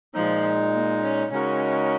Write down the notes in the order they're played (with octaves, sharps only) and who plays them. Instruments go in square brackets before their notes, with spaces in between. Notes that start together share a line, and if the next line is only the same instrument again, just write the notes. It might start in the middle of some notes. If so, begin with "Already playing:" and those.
[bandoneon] A#2 G#3 D#4 [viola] F3
[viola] A#3
C#4
[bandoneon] C#3 G#3 D#4 F#4 A#4 [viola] C#4